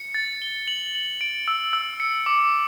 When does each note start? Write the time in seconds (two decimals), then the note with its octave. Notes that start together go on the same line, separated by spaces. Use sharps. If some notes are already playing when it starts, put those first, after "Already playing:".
Already playing: C#7
0.14 A6
0.42 G7
0.68 F#7
0.95 F#7
1.21 D7
1.48 E6
1.73 E6
2.00 C#7
2.26 D6